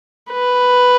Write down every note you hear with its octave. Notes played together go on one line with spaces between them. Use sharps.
B4